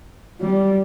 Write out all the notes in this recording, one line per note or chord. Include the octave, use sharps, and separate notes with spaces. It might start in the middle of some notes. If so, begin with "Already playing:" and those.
G3